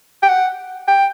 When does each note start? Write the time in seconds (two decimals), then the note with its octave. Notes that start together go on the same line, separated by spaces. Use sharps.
0.23 G5
0.29 F#5
0.88 G5